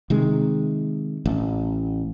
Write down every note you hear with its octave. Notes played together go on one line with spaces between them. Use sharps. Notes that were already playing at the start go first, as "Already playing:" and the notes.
C3 D#3 G#3
A1